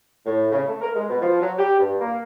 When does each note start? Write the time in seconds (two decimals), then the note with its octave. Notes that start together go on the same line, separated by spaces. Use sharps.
0.26 A2
0.52 C#3
0.68 A3
0.82 A#4
0.96 G#3
1.09 B2
1.21 F3
1.41 F#3
1.59 G4
1.80 G2
2.00 A#3